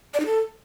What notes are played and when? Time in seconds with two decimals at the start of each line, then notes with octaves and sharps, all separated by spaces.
0.14 D5
0.20 D#4
0.26 A4